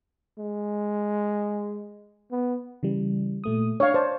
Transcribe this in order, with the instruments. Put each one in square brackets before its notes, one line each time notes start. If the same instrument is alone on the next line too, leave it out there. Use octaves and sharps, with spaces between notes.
[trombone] G#3
B3
[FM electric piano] C#3 E3 G3
A#2 A3 D#6
[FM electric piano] D4 [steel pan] C#5 F5
[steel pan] C5 [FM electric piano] D5 A5